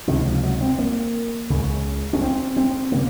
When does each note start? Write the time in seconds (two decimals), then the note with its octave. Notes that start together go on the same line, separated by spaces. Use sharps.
0.08 C#2 C3 D#3
0.25 F3
0.43 F#3
0.61 C4
0.78 A#3
1.50 C#2 C#3
2.13 C#4
2.21 C4
2.56 C4
2.92 C#3 A#3